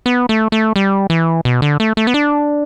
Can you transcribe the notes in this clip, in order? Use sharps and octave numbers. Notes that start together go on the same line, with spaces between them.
B3
A3
A3
G3
E3
B2
D3
A3
A3
B3
D4